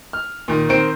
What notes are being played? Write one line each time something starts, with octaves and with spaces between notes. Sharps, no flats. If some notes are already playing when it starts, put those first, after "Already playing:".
F6
A#2 D#3
D#3 C4 C5 D7